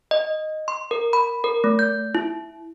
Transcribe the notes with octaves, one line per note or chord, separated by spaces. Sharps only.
D#5
C6
A#4
B5
A#4
A3
G6
E4